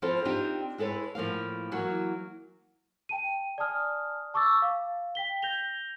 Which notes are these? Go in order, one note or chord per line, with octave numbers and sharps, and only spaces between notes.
F3 C4 E4 F4 A4 C5
C4 D4 D#4 F4 G4
G#3 E4 A4 B4 C#5
A2 F3 A#3 F5
E3 F#3 A#3
G5 A5 D#7
D5 G#5 A5 D#6 F6
A5 C#6 D6 E6 A6
F5
G5 B6 G7
G6 A#6 F7 G7